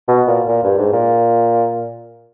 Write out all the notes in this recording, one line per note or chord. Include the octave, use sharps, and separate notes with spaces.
B2
A#2
A#2
G2
G#2
A#2